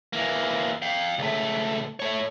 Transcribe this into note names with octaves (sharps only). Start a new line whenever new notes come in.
E3 A#3
F5 G5
C#2 A3
A3 C#5